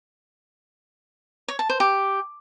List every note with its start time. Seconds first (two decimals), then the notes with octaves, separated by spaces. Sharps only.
1.48 C#5
1.59 A5
1.70 C5
1.80 G4